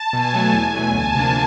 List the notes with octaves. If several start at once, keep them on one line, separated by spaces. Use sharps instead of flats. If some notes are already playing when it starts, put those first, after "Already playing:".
Already playing: A5
B2 G#5
F#3 A3
E2
B2 F#3 A3
D2 A5
C3 F3 A#3 D4